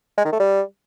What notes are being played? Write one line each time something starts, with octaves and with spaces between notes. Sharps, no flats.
G#3
D#3
A3
G3